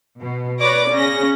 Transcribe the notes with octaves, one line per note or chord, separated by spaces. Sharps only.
B2
B4 C#5 D5 D6 A#6
C#3 C#4 A#6